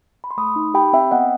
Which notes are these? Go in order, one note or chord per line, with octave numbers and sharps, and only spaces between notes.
B5
C6
A3 B5 D#6
D#4
G4 G5 B5
C4 E5 G5
B3 D#5 F#5